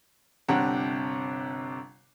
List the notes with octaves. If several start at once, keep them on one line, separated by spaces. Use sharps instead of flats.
G1 C3 D4 G4 F#5 A#5